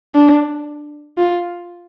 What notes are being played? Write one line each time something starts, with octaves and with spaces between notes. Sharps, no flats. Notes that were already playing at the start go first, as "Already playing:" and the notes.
D4
F4